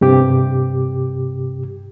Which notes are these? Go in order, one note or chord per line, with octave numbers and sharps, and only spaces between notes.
G2 C3 G4 D6